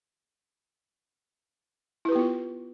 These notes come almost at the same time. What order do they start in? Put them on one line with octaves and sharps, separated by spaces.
E4 B4 G4 B3 F4